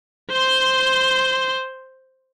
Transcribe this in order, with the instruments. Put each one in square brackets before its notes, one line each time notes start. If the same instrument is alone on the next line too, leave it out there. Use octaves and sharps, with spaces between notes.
[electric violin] C5 C6